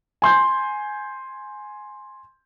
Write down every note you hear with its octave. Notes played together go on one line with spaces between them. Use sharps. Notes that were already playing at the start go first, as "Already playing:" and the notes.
G#5 C6 G6